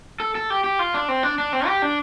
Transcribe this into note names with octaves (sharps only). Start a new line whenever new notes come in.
A4
A4
G4
G4
F4
D4
C4
D4
D4
C4
G4
D4